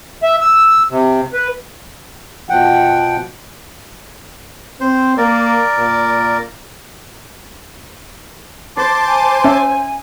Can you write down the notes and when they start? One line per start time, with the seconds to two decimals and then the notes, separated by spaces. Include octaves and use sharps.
0.23 E5
0.41 E6
0.90 C3
1.33 B4
2.50 B2 F3 F#5 G5
4.81 C4 C5
5.18 A#3 A#4 D5
5.78 A#2
8.77 C5 A5 C6 D6 A6
9.07 G#5
9.44 C#4 E5